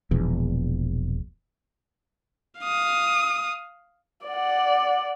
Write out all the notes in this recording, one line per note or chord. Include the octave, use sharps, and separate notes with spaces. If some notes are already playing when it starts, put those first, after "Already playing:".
E1 A#1 E2
F5 D#6
D5 F#5